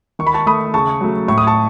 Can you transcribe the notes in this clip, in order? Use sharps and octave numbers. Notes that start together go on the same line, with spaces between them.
D#3 C#6
B5
A5 C#6
A3 B5 D#6
C#3 A5 C#6
F#3 A3
A2 C#6
D#6
A5 C#6